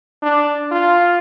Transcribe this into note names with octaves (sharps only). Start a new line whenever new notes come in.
D4
F4